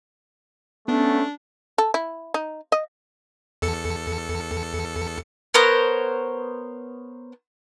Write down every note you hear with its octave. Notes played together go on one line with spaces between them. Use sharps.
A3 B3 C#4 D4
A4
E4
D#4
D#5
E2 A4 C#7
B3 A#4 C5 C#5